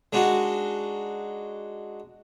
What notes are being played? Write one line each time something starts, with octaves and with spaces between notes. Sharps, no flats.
G#3 D4 D#4 F#4